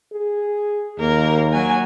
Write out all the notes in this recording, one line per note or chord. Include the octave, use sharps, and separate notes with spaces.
G#4
D#2 A#3 A#4
F#3 G#5